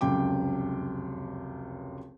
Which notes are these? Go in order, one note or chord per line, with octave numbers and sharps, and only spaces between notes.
F1 C#2 F#2 G5 D6